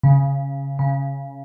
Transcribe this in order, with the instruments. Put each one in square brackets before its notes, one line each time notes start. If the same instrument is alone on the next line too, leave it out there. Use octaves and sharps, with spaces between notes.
[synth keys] C#3
C#3